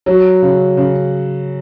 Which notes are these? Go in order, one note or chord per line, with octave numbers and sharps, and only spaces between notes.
F#3
C#3
C#3